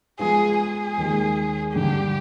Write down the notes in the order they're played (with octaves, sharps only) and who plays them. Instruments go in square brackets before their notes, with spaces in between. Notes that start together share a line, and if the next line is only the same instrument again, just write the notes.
[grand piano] F3 G#3 B3 [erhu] G#4
[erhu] G#4
[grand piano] D#2 D#3 G#3
[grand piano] G2 D3 G3 [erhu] G4